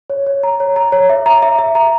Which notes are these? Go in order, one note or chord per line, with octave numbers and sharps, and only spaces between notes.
C#5
C#5
A#5
C#5
A#5
C#5
E5
A#5
E5
E5
A#5